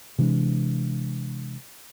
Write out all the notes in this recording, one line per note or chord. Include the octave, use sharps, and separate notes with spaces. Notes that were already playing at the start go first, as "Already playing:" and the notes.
C3 E3 G#3 D4